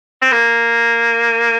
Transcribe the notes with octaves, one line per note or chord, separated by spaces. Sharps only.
C4
A#3